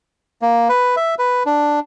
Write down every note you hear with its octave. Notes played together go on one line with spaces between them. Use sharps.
A#3
B4
E5
B4
D4